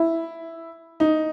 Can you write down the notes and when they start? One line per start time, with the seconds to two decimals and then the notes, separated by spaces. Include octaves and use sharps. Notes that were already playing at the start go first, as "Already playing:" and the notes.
Already playing: E4
1.00 D#4